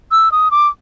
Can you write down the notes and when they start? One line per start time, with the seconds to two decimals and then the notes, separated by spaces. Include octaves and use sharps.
0.12 E6
0.32 D#6
0.51 D6